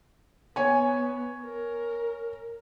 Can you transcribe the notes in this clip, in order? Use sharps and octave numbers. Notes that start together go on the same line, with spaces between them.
B3 C#5 G#5
A#4